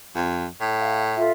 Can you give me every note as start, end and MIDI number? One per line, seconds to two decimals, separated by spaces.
0.15 0.47 41
0.60 1.28 45
0.78 1.02 76
0.78 1.02 77
1.17 1.32 65
1.17 1.32 69
1.17 1.32 76